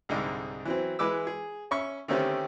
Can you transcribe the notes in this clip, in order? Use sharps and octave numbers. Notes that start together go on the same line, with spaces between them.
C2 G#2 D3 D#4
E3 F#3 C4
E3 G#3 B4 D6 E6
G#4
C#4 E5 C#6
D3 D#3 A3 C4 C#4 G4